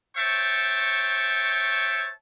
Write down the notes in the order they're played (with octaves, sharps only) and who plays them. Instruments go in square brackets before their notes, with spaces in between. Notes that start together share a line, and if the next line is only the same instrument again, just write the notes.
[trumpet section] C5 C#5 E5 G5 A5 C#6